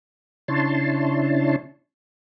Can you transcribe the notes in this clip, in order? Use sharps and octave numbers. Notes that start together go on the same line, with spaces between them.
C#3 D4 E4 C#5 A5 C6